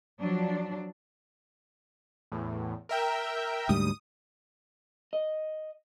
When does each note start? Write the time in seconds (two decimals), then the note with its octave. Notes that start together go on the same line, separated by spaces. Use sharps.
0.21 F3 F#3 D4
2.32 E2 A2
2.89 A#4 E5 G5
3.69 D2 G#2 G3 D#6
5.13 D#5